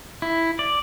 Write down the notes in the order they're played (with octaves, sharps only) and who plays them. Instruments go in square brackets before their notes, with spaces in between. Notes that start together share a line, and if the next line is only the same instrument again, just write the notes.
[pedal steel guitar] E4
D5